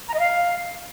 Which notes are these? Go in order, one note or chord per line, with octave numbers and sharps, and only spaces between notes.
A#5
D#5
F5